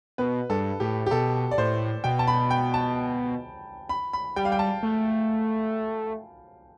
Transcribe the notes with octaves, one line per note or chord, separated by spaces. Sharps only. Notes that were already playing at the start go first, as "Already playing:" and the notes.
B2 B4
G2 A4
A2 G4
G4
B2 A4
D5
A2 C5
B2 G5
A5
B5
G5
A5
B5
B5
G3 G5
F5
G5
A5
A3